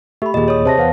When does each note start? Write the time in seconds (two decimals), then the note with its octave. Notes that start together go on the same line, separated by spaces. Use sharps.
0.22 A3 G4 B5
0.34 D#2 A#2 G#4 D#5
0.48 C#5 D#6
0.65 C3 C5 A5 A#6
0.77 E2 B4 F5 F#5